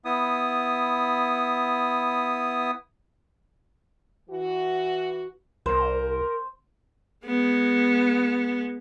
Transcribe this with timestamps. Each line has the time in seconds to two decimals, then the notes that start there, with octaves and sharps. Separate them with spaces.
0.05 B3 E4 D#6
4.30 E3 F#4
5.66 C2 A#4 C5
7.25 G#3 B3